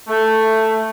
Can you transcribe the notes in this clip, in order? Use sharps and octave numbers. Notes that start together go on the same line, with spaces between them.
A3